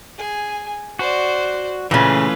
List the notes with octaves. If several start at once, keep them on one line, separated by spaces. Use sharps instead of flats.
G#4 G#5
F#4 C5 D5
A#2 C#3 E3 A3 C#4 F4 B4